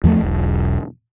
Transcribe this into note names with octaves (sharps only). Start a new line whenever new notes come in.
E2 F3 G3 A3
E1 B1